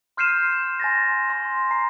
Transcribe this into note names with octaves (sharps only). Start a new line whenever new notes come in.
C6 F6 G6 C7 D#7 E7
G#5 C6 A6 A#6
C6
A#5 C7